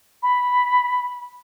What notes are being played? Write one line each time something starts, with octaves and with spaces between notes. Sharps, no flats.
B5